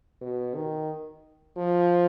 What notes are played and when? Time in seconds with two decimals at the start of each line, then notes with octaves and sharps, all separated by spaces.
0.21 B2
0.55 D#3
1.57 F3